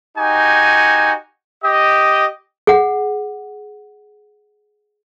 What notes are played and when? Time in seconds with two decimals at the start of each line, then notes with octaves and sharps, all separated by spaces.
0.18 D#4 F#4 G4 G#5
1.64 G4 D#5
2.67 G#4 F#5